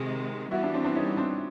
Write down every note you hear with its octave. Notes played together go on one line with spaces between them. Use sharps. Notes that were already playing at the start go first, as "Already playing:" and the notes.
Already playing: C3 D#3 G#3 F#4
E3 G3 B3 E4 F#4
D4 E4
C4 D4
C4 D4
C#4 D#4
C4 D4